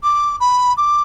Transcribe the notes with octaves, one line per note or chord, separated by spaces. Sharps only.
D6
B5
D6